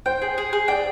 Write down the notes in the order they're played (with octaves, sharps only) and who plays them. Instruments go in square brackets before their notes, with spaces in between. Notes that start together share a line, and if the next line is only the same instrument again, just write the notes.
[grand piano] C5 [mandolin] G5
[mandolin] G#4
G#4
G#4
[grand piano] D5 [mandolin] G5